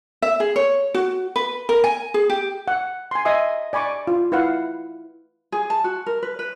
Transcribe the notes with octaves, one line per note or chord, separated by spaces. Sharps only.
E5
G#4
C#5
F#4
B4
A#4
G#5
G#4
G4
F#5
G#5 C6
D#5 E5 G#5 D#6
D5 G#5 B5 C#6 D6
F4
E4 B4 F5 F#5
G#4
A5
F#4
A#4
B4
B4